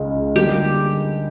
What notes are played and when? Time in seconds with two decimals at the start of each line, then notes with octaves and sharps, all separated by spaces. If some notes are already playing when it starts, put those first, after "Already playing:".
Already playing: C#2 C#3 D#4
0.36 D3 G3 A#3 D#4 G4